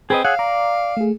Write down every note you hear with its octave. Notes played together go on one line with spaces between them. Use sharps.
C4 G#4 B4 D#5
G#4 C#5 F5 F#5 E6
D5 A#5
A3 G#4